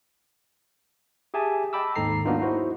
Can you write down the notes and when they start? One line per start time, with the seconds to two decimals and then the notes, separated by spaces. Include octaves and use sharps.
1.34 G4 G#4 E5 G#5 A5
1.73 D#5 G5 A5 B5 D6 E6
1.96 G#1 D#2 G#2 A4 A#5 C7
2.25 F#3 A#3 B3 D4 D#4 F4
2.40 D#4 E4 F#4 C5